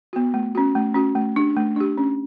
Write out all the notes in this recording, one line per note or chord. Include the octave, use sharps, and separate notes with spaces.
B3 F#4
A3
C#4 F#4
A3
C#4 F#4
A3
D4 G4
A3
D4 G4
C#4